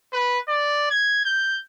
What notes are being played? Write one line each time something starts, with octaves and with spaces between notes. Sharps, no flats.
B4
D5
G#6
G6